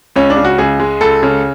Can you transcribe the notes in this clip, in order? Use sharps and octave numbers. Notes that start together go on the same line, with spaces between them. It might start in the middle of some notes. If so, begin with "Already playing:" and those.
C#2 C#4
D4
C#3
F#4
C#2 G#4
G#3
C#2 A4
C#3